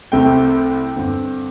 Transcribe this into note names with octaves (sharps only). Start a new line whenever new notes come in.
C2 C3 A3 C4 G5
G2 D3 C4